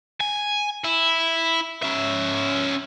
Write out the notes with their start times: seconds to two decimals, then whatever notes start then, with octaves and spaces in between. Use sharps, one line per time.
0.21 G#5
0.85 E4
1.83 C#4 E5